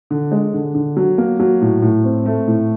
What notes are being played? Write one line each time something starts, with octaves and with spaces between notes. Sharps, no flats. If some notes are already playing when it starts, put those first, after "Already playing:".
D3
G#3
D3
D3
F#3
A#3
F#3
A2
A2
C4
A3
A2